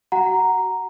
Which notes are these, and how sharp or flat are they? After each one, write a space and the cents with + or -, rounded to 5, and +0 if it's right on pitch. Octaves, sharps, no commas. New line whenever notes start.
F#4 +20 F#5 +0 A#5 +0